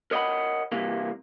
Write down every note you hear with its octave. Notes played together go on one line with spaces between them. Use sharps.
A#4 C#5 D#5 F5 F#5 B5
C2 C3 E3 A#3